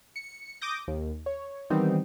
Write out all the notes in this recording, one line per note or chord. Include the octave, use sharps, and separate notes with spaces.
C#7
D6 D#6 G6 A#6
D#2
C#5
D#3 E3 G3 B3 C4 D#4